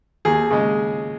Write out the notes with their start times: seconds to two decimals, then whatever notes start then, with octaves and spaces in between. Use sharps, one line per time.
0.25 D#2 G#4
0.51 C#3 G#3